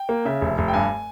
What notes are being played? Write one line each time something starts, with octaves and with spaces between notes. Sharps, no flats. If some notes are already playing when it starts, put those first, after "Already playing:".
Already playing: G5
A#3
C#3 E5
F1
F1
G5
G2 G#5